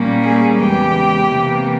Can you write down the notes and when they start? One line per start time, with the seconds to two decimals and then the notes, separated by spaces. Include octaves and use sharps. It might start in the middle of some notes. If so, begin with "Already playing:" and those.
Already playing: A#2 G3 A#3 C#4
0.24 G#4
0.59 E2 C#3 E3 G#3 G4
1.29 C3 E3 A#3